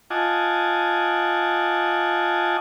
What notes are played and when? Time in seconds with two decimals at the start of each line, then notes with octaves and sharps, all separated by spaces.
0.10 F4 D#5 F#5 G#5 A5 D6